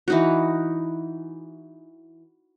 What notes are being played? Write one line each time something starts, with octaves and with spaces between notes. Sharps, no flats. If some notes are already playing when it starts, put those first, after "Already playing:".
E3 D#4 F#4